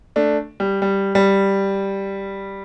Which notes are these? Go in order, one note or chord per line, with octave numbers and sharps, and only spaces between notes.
A3 D4
G3
G3
G3